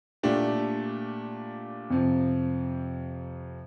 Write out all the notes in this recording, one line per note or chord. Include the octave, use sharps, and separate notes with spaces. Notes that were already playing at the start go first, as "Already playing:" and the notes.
A#2 A3 D4 G4
F2 C3 F3